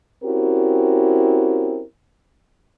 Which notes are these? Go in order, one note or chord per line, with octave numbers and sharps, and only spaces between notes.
C4 C#4 E4 F#4 G4 A#4